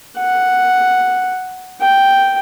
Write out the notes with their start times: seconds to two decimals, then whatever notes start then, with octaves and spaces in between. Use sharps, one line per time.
0.17 F#5
1.81 G5